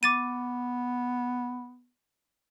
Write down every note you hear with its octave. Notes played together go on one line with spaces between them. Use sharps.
B3 D6 A6 D#7